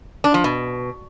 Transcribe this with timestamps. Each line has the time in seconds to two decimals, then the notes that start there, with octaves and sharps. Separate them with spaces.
0.24 D4
0.34 F3
0.44 B2